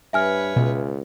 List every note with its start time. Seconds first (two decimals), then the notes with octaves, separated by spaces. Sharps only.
0.13 G2 B4 C#5 E5 G#5 F6
0.56 C#2 B2